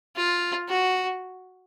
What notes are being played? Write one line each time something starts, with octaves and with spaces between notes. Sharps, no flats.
F4
F#4